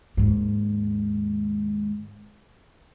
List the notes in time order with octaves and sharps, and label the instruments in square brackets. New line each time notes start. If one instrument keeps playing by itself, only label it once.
[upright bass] D#2 G#2